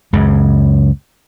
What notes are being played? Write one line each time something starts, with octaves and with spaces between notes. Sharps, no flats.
C#2 F#2 C#3